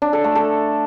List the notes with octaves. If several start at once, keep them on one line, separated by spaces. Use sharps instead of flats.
D4
A4
A3
A4